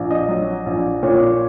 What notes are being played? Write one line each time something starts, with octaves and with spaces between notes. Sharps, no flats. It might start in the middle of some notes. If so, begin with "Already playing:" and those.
Already playing: A#1
D#5
F#3
A#1
A#2 C#5